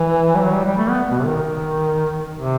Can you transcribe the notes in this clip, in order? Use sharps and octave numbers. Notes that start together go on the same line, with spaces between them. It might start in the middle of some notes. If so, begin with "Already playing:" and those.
Already playing: E3
G3
F#3
G3
G3
A3
B3
B2
C3
D#3
C3